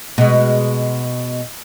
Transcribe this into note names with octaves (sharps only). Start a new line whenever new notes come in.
B2 G#3